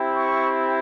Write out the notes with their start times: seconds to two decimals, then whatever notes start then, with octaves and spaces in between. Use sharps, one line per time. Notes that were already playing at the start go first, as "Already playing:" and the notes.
Already playing: C4 E4 G4
0.17 C#6